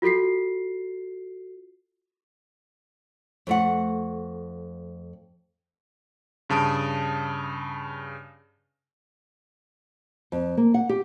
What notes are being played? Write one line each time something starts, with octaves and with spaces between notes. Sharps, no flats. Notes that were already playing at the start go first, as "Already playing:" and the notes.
F4 F#4 A4 B6 C7
F2 A3 F#5
G2 C#3 A5 D#6 D7
F2
A#3
F#5
G4